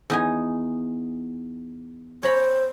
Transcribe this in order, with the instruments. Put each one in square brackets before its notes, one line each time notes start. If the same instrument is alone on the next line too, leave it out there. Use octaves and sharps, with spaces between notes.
[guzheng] E2 D#4 G#5
[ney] C5 [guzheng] C#5 A#5 B5